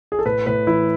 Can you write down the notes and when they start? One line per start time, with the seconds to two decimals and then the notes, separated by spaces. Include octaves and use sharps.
0.12 G#4
0.19 A4
0.25 A2 B4
0.46 A2 B4
0.67 E3 E4